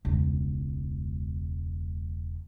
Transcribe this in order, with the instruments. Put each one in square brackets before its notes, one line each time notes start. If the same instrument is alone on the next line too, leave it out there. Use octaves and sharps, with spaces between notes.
[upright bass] E1 C#2